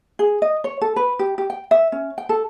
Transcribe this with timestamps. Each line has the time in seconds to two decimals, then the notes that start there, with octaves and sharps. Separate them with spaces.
0.19 G#4
0.42 D#5
0.64 C#5
0.81 A4
0.96 B4
1.19 G4
1.38 G4
1.50 G5
1.71 E5
1.92 C#4
2.18 G5
2.29 A4